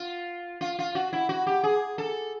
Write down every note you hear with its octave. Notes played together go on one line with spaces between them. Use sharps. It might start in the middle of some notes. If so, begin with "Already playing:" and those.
Already playing: F4
F4
F4
F#4
E4
F#4
G4
G#4
A4